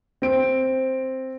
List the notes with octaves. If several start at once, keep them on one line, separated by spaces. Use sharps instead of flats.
C4 D7